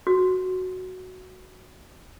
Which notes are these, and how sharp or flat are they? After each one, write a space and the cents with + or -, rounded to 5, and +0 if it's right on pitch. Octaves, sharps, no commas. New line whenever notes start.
F#4 +0